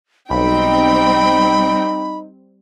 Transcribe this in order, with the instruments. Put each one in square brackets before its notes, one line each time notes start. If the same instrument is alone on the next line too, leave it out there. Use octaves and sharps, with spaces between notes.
[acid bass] B1 [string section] G3 C4 G5 [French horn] D#4 [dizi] B5